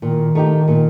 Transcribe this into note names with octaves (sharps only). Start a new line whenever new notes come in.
A#2 D#3
A3 D#4 G4
A#2